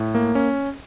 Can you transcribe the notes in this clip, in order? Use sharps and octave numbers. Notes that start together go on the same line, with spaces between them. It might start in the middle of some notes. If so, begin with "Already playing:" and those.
Already playing: A2
A#3
C#4